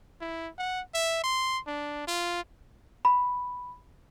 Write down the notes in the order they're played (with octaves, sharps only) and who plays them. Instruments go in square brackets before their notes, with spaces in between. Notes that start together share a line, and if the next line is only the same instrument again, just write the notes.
[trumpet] E4
F#5
E5
C6
D4
F4
[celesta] B5